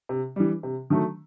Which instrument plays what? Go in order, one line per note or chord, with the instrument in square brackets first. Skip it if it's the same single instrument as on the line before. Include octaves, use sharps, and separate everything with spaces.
[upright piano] C3
E3 G3
C3
D#3 F#3 A3